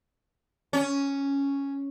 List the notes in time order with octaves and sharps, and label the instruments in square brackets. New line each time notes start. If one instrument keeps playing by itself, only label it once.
[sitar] C#4